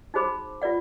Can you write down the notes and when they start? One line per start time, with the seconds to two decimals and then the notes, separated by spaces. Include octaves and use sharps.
0.14 D#4 F#4 G#4 C5 B5 D6
0.62 F4 B4 D5 F#5